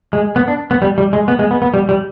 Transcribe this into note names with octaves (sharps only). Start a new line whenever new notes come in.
G#3
B3
D4
B3
G3
G3
G#3
B3
G#3
B3
B3
G3
G3